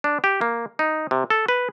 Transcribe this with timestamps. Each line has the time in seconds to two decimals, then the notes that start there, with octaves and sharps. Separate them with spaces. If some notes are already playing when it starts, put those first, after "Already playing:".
0.04 D4
0.24 G4
0.41 A#3
0.79 D#4
1.11 C3
1.30 A4
1.48 B4